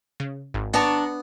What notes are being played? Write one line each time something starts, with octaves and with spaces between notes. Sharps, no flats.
C#3
G#1
B3 D4 A5 A#5 C#6